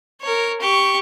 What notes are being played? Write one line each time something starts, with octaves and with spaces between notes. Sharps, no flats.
A#4 C#5
G4 C#6